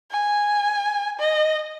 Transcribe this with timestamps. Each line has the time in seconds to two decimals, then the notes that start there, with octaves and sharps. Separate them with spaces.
0.11 G#5
1.20 D#5